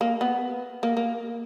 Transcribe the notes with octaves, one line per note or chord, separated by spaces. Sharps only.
A#3
B3
A#3
A#3